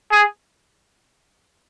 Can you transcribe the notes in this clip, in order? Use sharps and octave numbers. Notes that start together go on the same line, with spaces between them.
G#4